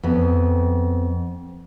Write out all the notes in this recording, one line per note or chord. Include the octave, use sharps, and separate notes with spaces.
F2 B3